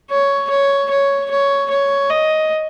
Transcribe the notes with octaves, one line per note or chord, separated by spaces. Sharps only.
C#5
C#5
C#5
C#5
C#5
D#5